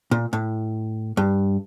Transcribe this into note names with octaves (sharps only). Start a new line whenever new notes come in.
A#2
A2
G2